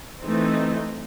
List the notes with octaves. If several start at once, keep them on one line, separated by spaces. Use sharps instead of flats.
E3 A3 C4 D#4